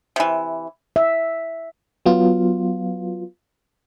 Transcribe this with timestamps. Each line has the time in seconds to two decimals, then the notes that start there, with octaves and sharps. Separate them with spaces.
0.16 C3 E3
0.96 E5
2.06 F#3 B3 F4